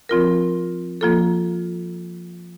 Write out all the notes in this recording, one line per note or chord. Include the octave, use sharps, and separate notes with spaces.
F3 C4 F4 A#4
F3 A#3 F4 A4